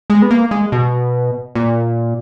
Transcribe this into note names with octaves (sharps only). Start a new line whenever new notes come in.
G#3
B3
A#3
G#3
B2
A#2